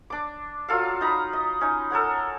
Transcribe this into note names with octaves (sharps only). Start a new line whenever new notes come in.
D4 D6
F#3 F4 A4 F5
D#4 A#5 B5
D#5
C#4 D#4
A4 A#4 C#5 F#5